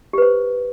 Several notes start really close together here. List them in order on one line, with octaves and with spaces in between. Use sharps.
G4 B4 C5